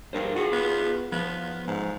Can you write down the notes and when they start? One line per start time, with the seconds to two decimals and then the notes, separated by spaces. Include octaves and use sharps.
0.13 G2 D4 A#4 C5
0.36 F4 F#4 G#4 A4
0.52 B3
1.12 F3 B3
1.67 G#2